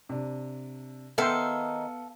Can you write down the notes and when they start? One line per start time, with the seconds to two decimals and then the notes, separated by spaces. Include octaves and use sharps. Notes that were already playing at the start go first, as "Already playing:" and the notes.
0.09 C3 D4
1.18 D#3 B3 D#4 A4 E5 F5 G5 C6